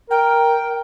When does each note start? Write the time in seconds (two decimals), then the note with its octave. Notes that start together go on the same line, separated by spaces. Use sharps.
0.10 A#4 G5